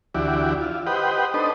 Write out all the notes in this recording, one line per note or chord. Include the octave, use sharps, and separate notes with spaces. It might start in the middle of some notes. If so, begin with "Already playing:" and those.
D2 E3 E4 F#4 G4 D5
E4 F4
G4 B4 C5 D#5 F#5 G5
D4 D#4 A4 B4 C5 D#5